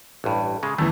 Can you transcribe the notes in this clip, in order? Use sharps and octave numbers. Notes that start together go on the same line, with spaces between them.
A1 G2
C#3 G#3
E2 E3 A3